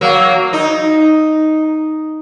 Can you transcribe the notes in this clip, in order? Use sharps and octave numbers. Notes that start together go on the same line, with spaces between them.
F#3 A#3
D#4